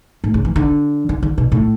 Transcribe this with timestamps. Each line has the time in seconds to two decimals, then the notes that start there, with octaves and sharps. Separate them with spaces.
0.24 A2
0.34 C#3
0.45 E3
0.56 D3
1.09 D3
1.23 D3
1.38 B2
1.52 A2